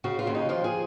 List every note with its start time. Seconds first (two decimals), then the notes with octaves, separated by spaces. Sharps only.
0.04 C#3 F#4
0.19 F4
0.27 D#2
0.35 D#4
0.49 F3 F4
0.64 G#4